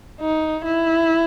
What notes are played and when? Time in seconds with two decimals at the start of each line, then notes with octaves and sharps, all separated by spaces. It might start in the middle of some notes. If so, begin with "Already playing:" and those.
0.21 D#4
0.66 E4